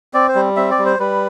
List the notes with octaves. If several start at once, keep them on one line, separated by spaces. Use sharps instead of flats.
C4 D5
C5
G3
C4 E5
D5
G3
C5
G3 B4